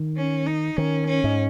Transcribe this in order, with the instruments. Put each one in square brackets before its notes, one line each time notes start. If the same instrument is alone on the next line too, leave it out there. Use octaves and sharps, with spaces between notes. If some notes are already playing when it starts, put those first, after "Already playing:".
Already playing: [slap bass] D#3
[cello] C#4
D#4
[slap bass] D#3 [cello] C#4
[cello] C#4
[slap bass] G#2